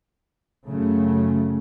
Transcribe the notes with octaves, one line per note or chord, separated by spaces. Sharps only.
F#2 C#3 A3